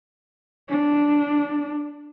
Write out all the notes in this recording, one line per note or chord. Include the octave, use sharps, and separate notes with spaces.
D4